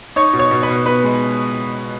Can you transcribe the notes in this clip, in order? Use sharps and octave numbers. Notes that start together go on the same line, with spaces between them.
D#4 C#5 C#6
B2
C#5 C#6
B2
B4 B5
B2
B3 B4 B5
G#3